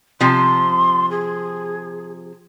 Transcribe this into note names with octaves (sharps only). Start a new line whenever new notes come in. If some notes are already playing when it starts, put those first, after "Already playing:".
C3 F3 C6
G#4